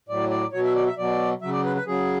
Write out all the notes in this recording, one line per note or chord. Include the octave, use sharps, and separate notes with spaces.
A2 F#3 D5
D5
B2 F#3 C#5
E5
D5
E5
B2 F#3 D5
C#3 F#3 E5
D5
B4
B4
C#3 F#3 G#4